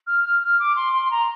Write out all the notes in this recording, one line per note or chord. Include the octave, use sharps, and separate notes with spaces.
F6
F6
F6
D6
C6
C6
C6
A#5